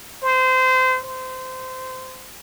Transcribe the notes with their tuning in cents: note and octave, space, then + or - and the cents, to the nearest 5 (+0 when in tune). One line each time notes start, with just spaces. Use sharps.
C5 -25
C5 -20